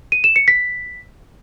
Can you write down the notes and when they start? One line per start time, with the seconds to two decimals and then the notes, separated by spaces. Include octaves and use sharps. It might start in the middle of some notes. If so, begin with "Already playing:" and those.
0.12 D#7
0.24 E7
0.36 C#7
0.48 B6